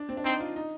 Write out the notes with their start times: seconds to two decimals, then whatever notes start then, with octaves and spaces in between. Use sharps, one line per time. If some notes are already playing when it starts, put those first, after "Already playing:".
Already playing: D4
0.09 C4
0.17 D4
0.24 C4 D#4
0.40 F4
0.56 D#4